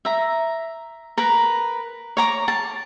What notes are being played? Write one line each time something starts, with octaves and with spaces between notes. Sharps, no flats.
E5 A#5
A#4 B4 A#5
C#5 A#5 D6
A5